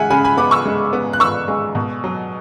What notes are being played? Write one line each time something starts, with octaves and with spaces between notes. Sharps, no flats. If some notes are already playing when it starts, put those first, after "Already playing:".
Already playing: C#3 G#3 E5 F#5 G#5
C#3 G#5 B5
G#5 B5
B3 B5 D6
C#6 E6
G#3
B3
F#6
B3 C#6 E6
G#3
B2
F#3